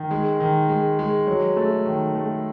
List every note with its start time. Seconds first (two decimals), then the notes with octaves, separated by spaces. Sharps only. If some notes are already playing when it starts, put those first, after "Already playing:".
Already playing: D#3
0.11 G#3
0.40 D#3
0.69 G#3
0.99 G#3
1.27 F#3
1.56 A3
1.86 D#3
2.15 A3